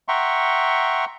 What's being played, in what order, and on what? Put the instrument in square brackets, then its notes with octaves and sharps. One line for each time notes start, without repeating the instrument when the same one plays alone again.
[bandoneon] E5 F#5 G5 A#5 C6 C#6